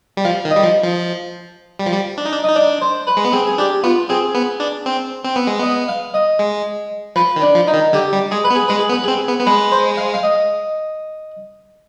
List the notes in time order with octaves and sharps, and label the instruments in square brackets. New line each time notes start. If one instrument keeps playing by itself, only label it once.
[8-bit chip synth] G3
[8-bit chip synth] F3 [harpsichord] F5
[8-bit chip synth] D#3
[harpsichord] D#5
[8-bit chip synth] G3
F3
F3
G3
F3
G3
D4
D#4
D4
[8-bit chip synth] D#4 [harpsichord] D#5
[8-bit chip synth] D4 [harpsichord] D5
[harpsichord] C5
B4
[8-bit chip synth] G#3
B3
[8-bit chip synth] C4 [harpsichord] G#4
[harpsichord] G#4
[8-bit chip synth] D4 [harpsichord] G4
[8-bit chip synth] B3 [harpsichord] F4
[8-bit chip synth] C4 [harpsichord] G#4
[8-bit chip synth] B3
D4
C4
C4
B3
G#3
[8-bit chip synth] B3 [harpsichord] D#5
[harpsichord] F5
D#5
[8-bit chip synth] G#3
[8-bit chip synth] F3 [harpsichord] B4
[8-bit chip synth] D#3
[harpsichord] D4
[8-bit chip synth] F3
[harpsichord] D#4
[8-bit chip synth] D#3
[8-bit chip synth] D3 [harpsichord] G4
[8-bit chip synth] G3
[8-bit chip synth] G#3 [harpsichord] G#4
[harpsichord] B4
[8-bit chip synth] B3
[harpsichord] G#4
[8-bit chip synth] G#3 [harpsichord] B4
[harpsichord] G#4
[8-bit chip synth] B3
[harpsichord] B4
[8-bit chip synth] C4 [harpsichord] G#4
[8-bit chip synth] B3
B3
[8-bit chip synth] G#3 [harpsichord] B4
[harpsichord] C5
F5
F5
D#5